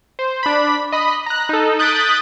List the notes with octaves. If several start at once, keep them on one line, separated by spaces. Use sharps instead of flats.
C5
D4 B5
D#5 B5
A#5 F#6
D#4 A4
D#6 F#6 G6 A6 B6 D7